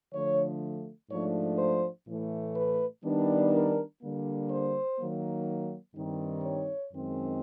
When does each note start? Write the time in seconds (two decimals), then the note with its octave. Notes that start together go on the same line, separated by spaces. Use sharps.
0.14 D3 F3 A3 C#5
1.11 G#2 F3 A3 D4 C#5
1.58 C5
2.08 A2 E3 A3
2.56 B4
3.04 D#3 G3 B3 D4
3.53 A#4
4.01 D3 G3 A#3
4.50 C5
4.98 D#3 F#3 A#3
5.95 G2 D#3 G3 C4 D#4
6.43 C#5
6.92 F#2 D#3 G#3 C4